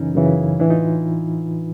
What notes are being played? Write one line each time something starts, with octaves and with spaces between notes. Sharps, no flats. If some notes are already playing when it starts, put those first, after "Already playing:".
Already playing: F#2 C#3 E3 C#4 D#4
F#2 C#3 E3
A2 E3 D4 E4
D#4 F4